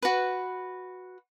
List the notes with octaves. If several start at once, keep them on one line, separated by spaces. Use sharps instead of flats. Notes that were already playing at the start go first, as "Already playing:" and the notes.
F#4 B4